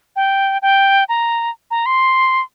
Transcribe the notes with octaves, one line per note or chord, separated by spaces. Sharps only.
G5
G5
A#5
A#5
C6